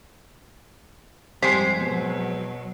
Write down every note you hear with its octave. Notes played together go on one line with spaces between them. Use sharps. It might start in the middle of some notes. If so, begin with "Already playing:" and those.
F2 G#2 G3 G#3 C5 B6 C7
B2 F#3